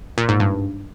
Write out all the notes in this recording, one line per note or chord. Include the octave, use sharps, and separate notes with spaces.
A#2
G#2
G2